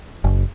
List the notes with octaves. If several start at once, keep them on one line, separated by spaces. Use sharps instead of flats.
F#1